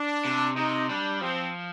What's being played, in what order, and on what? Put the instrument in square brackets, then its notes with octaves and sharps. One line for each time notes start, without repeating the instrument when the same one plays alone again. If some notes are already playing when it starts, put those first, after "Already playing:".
Already playing: [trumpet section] D4
[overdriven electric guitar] C3
[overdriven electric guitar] C3 [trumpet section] D#4
[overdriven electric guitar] G3 [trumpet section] D4
[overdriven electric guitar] F3 [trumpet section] C4